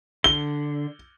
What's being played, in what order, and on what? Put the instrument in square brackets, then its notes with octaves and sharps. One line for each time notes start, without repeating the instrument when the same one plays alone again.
[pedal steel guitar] D3 [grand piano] G7